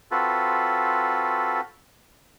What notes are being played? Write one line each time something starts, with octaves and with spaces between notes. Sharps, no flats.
C4 F4 F#4 A4 B4